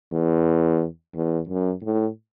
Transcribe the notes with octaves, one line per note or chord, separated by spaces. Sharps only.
E2
E2
F#2
A2